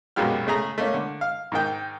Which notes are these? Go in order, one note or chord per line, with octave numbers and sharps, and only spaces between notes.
A#1 F#2 B2 G#3 G4 F6
C#3 A3 G#4 A#5
A3 A#3 C#4
D3
F5
G#2 D#3 G5